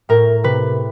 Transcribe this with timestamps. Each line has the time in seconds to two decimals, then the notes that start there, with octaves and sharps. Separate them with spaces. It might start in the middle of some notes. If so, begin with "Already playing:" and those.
0.09 A2 A#4
0.44 C3 B4